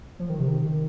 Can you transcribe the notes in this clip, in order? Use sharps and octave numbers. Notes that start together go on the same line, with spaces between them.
F3
D#3
C3
D#3